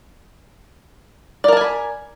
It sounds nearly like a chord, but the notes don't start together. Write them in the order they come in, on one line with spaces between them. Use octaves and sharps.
D5 A#4 A5 G#5 B5